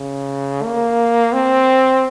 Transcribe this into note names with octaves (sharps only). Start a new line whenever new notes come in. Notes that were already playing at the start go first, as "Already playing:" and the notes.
Already playing: C#3
A#3
C4